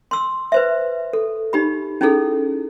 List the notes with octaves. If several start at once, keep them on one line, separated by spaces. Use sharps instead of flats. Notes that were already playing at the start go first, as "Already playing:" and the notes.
C6 E6
B4 C5 E5
A4
D#4 G4 B5
C#4 D#4 E4 G#4 A4